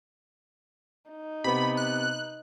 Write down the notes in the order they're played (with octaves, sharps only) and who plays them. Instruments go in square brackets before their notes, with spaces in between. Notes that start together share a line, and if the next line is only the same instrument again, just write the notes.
[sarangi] D#4
[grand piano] C3 B3 [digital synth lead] B5
[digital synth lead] F#6